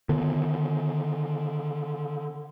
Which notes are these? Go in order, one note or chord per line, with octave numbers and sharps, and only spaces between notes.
D3 D#3 B3